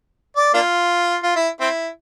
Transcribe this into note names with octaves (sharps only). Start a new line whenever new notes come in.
D5
A#3 D4 F4
F4
E4
C4 E4